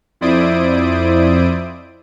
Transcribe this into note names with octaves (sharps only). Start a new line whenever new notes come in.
F2 E4 C5 D5 D#6 D7